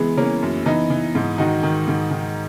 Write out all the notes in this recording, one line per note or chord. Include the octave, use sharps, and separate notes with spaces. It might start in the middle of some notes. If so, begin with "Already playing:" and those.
Already playing: E3 G#3 B3
E3 A#3 C#4
F#2
E3 B3 D#4
E3
G#2
D#3 D#4 F#4
D#3
G#2
D#3